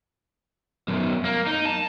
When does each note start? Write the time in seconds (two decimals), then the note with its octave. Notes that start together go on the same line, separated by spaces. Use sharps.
0.88 B1 F#2
1.25 A#3
1.47 D#4
1.66 A5